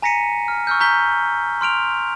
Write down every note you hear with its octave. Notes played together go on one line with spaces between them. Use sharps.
G#5 A#5 A#6 B6 C#7 D#7
F6
C#6 E6 F6 G6
A#5 C#6 G6 B6 G7
C6 F6 D7 F7